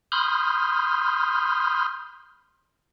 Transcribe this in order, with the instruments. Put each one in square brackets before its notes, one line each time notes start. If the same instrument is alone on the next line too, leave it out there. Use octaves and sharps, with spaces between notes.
[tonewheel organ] B5 C6 D#6 F6 G6